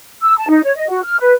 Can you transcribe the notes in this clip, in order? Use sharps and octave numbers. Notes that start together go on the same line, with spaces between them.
E6
A5
D#4
C#5
D#5
F#4
F6
B4